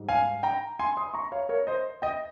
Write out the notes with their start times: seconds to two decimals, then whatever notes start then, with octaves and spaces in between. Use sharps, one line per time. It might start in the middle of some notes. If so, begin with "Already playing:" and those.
Already playing: G#2 G3
0.09 F5 G#5
0.43 G5 A#5
0.79 G#5 C6
0.97 C6 D#6
1.14 A#5 C#6
1.32 C#5 F5
1.49 A#4 C#5
1.67 C5 D#5
2.02 D#5 G5